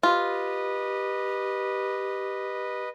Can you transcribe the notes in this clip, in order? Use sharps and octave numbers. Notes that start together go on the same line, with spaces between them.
F4 G4 B4 D#5